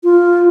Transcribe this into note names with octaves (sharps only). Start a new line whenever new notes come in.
F4